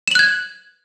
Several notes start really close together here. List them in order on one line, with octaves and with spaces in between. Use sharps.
E7 F#7 F#6 G#6